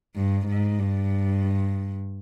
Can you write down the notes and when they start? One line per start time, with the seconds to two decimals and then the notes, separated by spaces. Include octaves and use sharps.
0.16 G2
0.48 G#2
0.79 G2